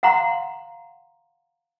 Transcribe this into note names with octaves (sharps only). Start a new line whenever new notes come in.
F5 F#5 A#5 C6